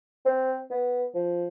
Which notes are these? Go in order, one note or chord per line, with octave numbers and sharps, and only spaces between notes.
C4
B3
F3